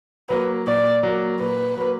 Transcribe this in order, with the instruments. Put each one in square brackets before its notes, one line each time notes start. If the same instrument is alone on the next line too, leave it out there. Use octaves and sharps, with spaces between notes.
[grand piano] F#3 A#3 [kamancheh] B4
[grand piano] A#2 [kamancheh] D5
[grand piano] F#3 A#3
[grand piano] A#2 [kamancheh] B4
[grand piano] F#3 A#3